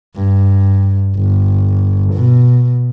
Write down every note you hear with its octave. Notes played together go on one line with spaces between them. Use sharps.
G2
G1
B2